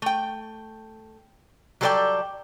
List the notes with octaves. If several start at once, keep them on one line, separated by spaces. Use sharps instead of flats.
A3 G5
F#3 G3 A4 A#4 D5 G5